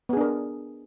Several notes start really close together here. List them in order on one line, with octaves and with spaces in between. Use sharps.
B3 G#4 D4 A#4